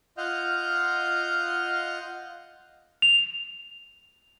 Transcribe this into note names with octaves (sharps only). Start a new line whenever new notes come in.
F4 D#5 F5 F#5 F6 G6
F7